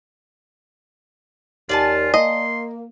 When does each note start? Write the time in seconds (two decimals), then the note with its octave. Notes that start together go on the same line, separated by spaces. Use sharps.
1.69 D#2 F4 D5 G#5 A5
2.14 A#3 D#5 C6